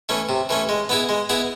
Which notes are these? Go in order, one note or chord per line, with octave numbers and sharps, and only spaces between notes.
E3 A3 C#4
C3
E3 A3 C#4
G#3
B3 E4 G#4
G#3
B3 E4 G#4